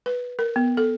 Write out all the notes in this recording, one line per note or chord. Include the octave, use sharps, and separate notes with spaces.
B4
A#4
B3
A4